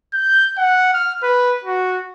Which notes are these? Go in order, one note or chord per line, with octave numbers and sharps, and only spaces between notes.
G6
F#5
F6
B4
F#4